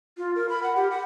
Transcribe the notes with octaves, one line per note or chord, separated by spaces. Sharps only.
F4
A#4
B5
F#5
G4
F#5